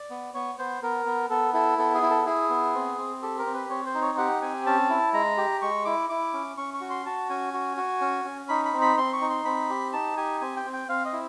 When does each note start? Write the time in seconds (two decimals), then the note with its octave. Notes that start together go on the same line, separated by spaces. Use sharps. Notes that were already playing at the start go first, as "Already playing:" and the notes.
Already playing: D5
0.10 B3
0.34 B3 C#5
0.58 B3 C5
0.83 B3 A#4
1.06 B3
1.30 B3 A4
1.54 E4 A4
1.78 B3 A4
1.94 G#4
2.02 E4
2.10 A4
2.26 E4 G#4
2.50 B3
2.75 C4
2.98 C4
3.22 G4 A4
3.38 A#4
3.46 C4
3.54 B4
3.70 C4 C#5
3.86 C5
3.94 D#4
4.02 C#5
4.18 G4 F#5
4.41 C4 G#5
4.66 C#4 A5
4.90 E4
5.13 G#3 A#5
5.37 G4
5.62 G#3 C#6
5.85 E4 D6
6.09 E4 D6
6.34 C#4
6.57 C#4 C#6
6.74 C#6
6.81 F#4
6.90 C6
7.06 F#4 A5
7.30 C#4 G#5
7.54 F#4
7.77 F#4
8.01 C#4
8.25 C#4
8.49 D#4 B5
8.65 B5
8.73 C4
8.82 B5
8.97 C4 C6
9.13 C#6
9.21 D#4
9.30 C6
9.45 C4 B5
9.70 G4
9.93 D#4 A5
10.17 G4 G#5
10.41 C4 G#5
10.56 G5
10.65 C4
10.73 G5
10.89 C4 F5
11.05 D#5
11.13 E4